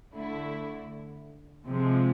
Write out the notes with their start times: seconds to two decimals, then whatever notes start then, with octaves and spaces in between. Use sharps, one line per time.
0.13 D3 A3 E4
1.68 C3 F3 G#3 C4